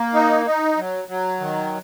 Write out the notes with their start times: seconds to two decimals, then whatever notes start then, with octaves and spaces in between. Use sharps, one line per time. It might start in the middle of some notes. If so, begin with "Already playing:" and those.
Already playing: A#3
0.14 D#4
0.46 D#4
0.77 F#3
1.08 F#3
1.40 D#3